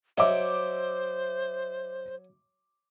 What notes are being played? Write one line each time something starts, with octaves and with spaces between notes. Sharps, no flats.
F#3 C5 D#5 E5 D6